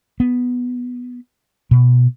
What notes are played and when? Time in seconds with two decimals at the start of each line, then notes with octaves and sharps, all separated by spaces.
0.20 B3
1.71 B2